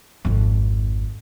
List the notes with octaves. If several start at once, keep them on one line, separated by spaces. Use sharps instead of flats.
G#1 F2